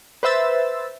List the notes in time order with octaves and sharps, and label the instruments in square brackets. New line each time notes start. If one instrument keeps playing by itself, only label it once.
[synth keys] B4 C5 E5 E6 A6